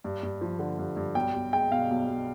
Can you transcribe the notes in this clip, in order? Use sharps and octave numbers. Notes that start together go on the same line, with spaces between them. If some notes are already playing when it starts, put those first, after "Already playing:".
G2
G2
F3
D3
G2
G2
B1 G5
B1
G#3 G5
B2 F5
B1
B1